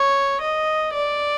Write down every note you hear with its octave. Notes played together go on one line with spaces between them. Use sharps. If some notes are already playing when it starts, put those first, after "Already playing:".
Already playing: C#5
D#5
D5